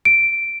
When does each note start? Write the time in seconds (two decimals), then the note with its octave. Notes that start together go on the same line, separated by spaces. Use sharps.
0.05 D7